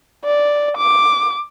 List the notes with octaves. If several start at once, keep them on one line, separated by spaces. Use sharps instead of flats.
D5
D6